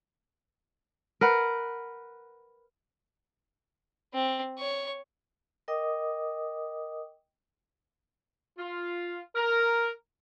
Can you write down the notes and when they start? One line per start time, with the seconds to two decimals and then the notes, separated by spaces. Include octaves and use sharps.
1.21 A#4 B4 F#5
4.13 C4
4.58 C#5 C#6
5.68 A#4 D#5 G5 D6 D#6
8.58 F4
9.36 A#4